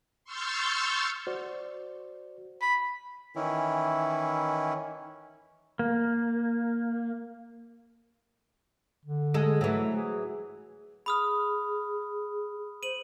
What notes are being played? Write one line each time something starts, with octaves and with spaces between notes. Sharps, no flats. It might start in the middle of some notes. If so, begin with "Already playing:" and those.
C6 C#6 E6 F6 G6 A6
F#4 C5 D5
B5
D#3 E3 C#4 E4
A#3
D3
G#3 A4
E3 F#3 A3
G#4
G#4 B5 D#6 F6
C5 D#7 F#7